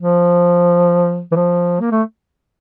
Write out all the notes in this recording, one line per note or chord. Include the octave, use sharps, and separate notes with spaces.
F3
E3
F3
A#3
A3